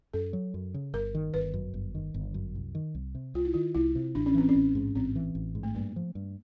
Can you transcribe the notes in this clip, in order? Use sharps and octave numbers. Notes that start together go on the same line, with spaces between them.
F#2 A4
F#3
F#2
C#3
G1 A#4
D#3
G1 B4
F#2
G1
D#3
G1
F#2
C2
D#3
C2
C3
C2 F4
E4
D#3 F4
C2 E4
C3
A1 D4
C#4
E3 C4
C#4
A1
G#2
A1 C4
E3
A1
G#2
A3
G2 A#3
F3
G2